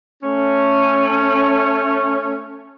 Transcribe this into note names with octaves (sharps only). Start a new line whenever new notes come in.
A3 C#4